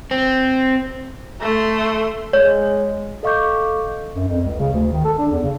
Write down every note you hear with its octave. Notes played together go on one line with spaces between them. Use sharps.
C4
A3 C6
G#3 C#5
A4 D#5 F5 C#6 D6 G6
F#2
F2
C#2
C#3
D2
D#3
A4
D4
E2
C#3